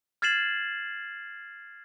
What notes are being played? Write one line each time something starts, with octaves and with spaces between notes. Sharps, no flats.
F6 G#6 A6 C7 E7 F#7